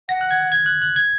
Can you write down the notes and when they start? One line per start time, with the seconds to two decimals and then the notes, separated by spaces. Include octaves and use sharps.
0.09 F#5 A#6
0.21 F#6
0.31 G#6
0.52 G#6
0.66 F#6
0.82 F#6
0.96 G#6